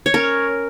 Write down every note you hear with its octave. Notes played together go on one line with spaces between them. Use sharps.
C#5
C#4 A#4